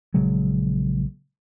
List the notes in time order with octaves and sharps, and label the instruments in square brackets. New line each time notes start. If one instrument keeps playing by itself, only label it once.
[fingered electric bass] A#1 C#3 F#3 G#3